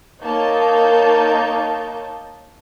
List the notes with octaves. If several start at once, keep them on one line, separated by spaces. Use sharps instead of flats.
A#3 D#4 C#5 A5 G6